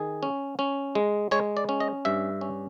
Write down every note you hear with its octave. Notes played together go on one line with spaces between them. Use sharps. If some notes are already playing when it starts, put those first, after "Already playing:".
Already playing: D#3 G#4
C#4
C#4
G#3
G#3 C#5
D5
C#4
D#5
G2 E5
C#4